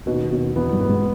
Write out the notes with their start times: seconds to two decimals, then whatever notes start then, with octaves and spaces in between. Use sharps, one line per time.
0.06 D#2 B2 D#3
0.31 B2
0.56 E2 E3 B3
0.72 G2 G3
0.81 B3
0.89 G#2 G#3